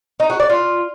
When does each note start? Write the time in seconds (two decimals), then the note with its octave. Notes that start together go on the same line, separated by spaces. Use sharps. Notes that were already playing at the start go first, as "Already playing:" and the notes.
0.20 D#4
0.30 F#4
0.40 D5
0.50 F4